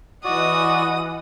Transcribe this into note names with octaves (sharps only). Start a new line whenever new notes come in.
E3 F#4 D5 D#5 F#5 D#6